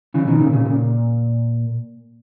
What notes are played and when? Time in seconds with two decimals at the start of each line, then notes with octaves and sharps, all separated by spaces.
0.14 C#3 E3
0.27 B2 D#3
0.40 A#2 C#3
0.53 A#2 C#3
0.66 A#2